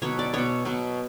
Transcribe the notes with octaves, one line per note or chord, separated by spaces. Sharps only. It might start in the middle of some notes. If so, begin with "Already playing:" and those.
B2 F#3 B3 C#5
D5
B2 F#3 B3 C#5
B2 F#3 B3